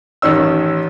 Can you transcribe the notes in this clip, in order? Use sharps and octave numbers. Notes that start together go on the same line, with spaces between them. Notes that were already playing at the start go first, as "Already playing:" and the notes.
A1 D#3 C#4 E6